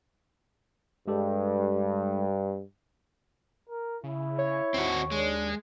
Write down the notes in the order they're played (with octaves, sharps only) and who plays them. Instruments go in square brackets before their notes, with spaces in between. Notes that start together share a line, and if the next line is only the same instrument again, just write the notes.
[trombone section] G2 [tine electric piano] G#3 G4 A4
[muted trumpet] A#4
[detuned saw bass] C#3 [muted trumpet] E4
[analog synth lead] C#5
[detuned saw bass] D#2 [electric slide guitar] C4 F#4
[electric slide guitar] G#3 [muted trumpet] D4